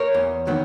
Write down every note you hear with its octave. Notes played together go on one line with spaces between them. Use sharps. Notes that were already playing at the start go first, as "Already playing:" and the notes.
Already playing: A#4 C#5
E2
D#3 F#3 B3